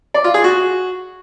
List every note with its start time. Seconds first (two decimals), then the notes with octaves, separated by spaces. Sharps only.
0.14 D5
0.24 F4
0.34 G#4
0.44 F#4